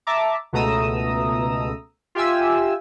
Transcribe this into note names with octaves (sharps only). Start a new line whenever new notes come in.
E5 A5 A#5 D6
C#2 B2 A3 A#5 D#6 E6
F4 G4 E5 G#5 E6